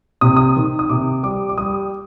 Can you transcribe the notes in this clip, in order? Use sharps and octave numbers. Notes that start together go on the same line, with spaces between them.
C3 D#6
D#6
D#3
D#6
C3 D6
G3 D6
D6
G3 D#6